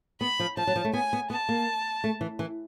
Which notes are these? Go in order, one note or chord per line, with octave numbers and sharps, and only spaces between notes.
B3 B5
F3
F3 A5
F#3
F3
A3
B3 G#5
B3
B3 A5
A#3
A3
E3
E3